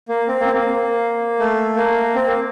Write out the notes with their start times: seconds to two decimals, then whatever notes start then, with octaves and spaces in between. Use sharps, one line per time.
0.08 A#3
0.28 C4
0.40 A#3
0.46 C4
0.53 A#3
1.39 A3
1.77 A#3
2.15 C4
2.27 A#3